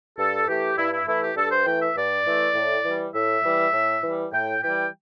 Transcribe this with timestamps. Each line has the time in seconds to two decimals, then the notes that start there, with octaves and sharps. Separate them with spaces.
0.18 G2 A4
0.48 E3 A3 G4
0.77 G2 E4
0.92 E4
1.07 E3 A3 E4
1.22 G4
1.37 G2 A4
1.51 C5
1.66 E3 A3 G5
1.82 E5
1.96 G2 D5
2.26 E3 A3
2.55 A2
2.84 E3 G3
3.14 A2 E5
3.44 E3 G3
3.73 A2
4.03 E3 G3
4.32 A2 G5
4.62 E3 G3 G5